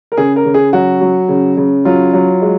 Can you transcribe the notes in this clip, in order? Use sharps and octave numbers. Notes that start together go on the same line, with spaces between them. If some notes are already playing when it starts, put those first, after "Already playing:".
A#4
C#3 G#4
A#4
C#3
G#4
F#3 F#4
F#3
C#3
C#3
F#3 F4
F#3
G#3